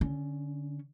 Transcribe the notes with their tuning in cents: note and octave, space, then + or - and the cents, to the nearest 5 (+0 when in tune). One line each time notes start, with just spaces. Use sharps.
D3 -10 C#4 +10